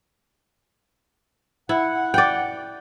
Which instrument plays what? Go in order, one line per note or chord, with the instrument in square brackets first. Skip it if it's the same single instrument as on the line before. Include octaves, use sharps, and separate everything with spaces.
[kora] E4 [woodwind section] F#5
[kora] D5 G5